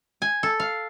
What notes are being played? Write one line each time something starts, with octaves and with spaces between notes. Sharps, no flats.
G#5
A4
F5